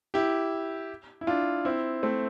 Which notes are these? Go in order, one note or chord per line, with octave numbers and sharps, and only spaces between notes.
E4 G4
E4
D4 F4
C4 E4
A3 C4